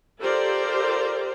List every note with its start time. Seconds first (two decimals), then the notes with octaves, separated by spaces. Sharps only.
0.20 F4 G4 A4 A#4 C5 D5